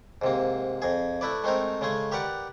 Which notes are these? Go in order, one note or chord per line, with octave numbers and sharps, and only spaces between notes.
G#2 C3 A#3
F2 G#4
A3 E4 B4 D5
G#3 A3 C4 D#4 A#4
C#3 G#3 A3 G#4
G4 A#4 B4 D5 F#5